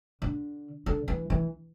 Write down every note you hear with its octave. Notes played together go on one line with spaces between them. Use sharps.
D3
D3
E3
E3